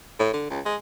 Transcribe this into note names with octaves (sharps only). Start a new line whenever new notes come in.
A2
D3
C#2
G#3